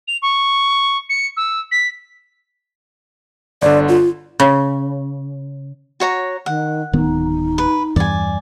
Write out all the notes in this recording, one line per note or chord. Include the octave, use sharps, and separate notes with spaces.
F7
C#6
C#7
E6
B6
G1 D3 D5
F4
C#3
F#4 C#5 A#5
D#3 F#5
D1 D#3 B3 D#4
B4
E2 G2 E3 D5 G#5